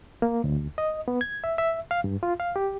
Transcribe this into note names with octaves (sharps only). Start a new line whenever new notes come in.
A#3
D2
D#5
B3
G#6
E5
E5
F5
G2
F4
F5
G4